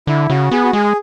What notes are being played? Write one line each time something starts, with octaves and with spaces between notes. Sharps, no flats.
D3 E4
C#3 F#4
B3 G#4
F#4
G#3 G#4